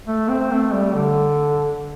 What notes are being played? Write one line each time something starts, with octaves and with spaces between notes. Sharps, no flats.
A3
C4
A3
G3
D3